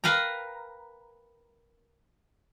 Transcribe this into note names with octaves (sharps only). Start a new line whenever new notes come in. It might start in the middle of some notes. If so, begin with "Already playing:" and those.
A#4 B4 F5 G5 A#5